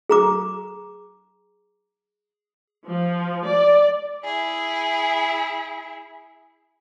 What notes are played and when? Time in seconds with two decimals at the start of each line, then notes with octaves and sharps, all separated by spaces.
0.09 G#4 A#5 D6
2.88 F3
3.46 D5
4.25 E4 G#4